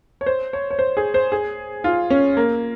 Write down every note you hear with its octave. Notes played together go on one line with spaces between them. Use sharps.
C#5
C5
C#5
C#5
C5
G#4
C5
G#4
F4
C#4
A#3